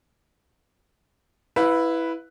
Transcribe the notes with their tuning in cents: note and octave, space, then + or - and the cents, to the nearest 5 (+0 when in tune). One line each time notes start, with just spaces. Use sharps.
E4 +0 B4 +0 F5 +40